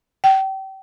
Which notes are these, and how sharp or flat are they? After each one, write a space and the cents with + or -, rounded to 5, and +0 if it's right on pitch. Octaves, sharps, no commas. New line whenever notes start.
G5 -30